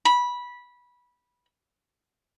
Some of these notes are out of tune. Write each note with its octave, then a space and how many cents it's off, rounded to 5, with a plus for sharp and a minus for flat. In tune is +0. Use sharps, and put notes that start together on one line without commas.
B5 -15